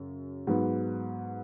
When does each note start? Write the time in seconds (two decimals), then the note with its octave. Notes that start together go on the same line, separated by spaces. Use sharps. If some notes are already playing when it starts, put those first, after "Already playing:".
Already playing: F#2 C#3
0.47 G#2 F#3 B3